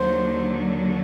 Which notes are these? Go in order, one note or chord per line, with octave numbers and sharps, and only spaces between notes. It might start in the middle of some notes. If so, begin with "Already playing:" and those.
Already playing: D#2 D3 F#3 C5